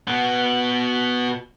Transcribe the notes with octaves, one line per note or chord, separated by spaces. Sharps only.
B2 B3